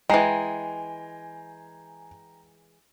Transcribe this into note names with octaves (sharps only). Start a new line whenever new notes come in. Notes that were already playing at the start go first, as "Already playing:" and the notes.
E3 G#3 G5 G#5 A#5 C7